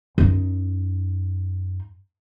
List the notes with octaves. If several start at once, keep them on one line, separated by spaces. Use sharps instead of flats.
F#2 D#4